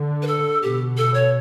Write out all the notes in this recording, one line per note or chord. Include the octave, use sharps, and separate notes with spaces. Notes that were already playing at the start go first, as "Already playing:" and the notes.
Already playing: D3
B4
A4
B2 G4
A4
C#5